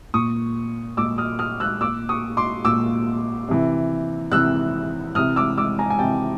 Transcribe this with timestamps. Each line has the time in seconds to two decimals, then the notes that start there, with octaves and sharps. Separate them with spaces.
0.14 A#2 C#6 D#6
0.97 A#2 D6 E6
1.18 D#6 F6
1.39 D#6 F6
1.60 E6 F#6
1.81 A#2 D6 E6
2.09 C#6 D#6
2.37 C6 D6
2.65 A#2 D6 E6
3.49 C3 E3
4.32 C3 E3 E6 F#6
5.15 C3 E3 D#6 F6
5.36 D6 E6
5.58 D6 E6
5.79 G#5 A#5
5.90 G#5
5.99 C3 E3 G5 A5